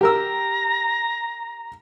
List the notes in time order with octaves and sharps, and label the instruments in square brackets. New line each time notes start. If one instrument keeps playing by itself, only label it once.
[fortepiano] G4 A#4 E6 [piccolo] A#5